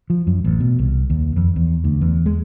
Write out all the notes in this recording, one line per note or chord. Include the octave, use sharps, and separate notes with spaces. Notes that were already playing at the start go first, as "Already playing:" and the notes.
F3
F#2
A1
B2
C2
D#2
F2
E2
D2
E2
G#3